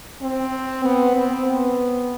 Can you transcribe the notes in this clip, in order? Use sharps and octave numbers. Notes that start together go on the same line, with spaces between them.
C4
B3
C4
B3